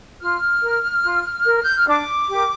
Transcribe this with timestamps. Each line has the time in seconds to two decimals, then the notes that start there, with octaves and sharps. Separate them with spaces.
0.21 F4 F6
0.63 A#4
1.05 F4
1.46 A#4
1.62 G6
1.75 F6
1.87 D4 D6
2.29 G4 A#4